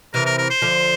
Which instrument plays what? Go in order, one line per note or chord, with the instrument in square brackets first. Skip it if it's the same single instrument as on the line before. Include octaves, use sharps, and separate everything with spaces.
[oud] C3 E3 [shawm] A#4
[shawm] A#4
A#4
C5
[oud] D3 F3